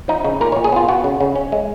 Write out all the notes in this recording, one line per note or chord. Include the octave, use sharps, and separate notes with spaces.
F3 D#4
C#3 D#4
A#2 A#4
A#2 C#5
G#4
B3 F4
B3 F#4
C#3
C#3
C#4
G#3